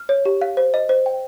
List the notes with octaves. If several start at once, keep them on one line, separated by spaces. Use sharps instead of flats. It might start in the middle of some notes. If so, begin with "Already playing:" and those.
Already playing: F6
C#5
G4
F5
C5
D#5
C5
G5